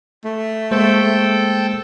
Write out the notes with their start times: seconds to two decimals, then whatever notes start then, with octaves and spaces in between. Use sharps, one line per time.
0.25 A3
0.71 G#3 A#3 A4 C5 G5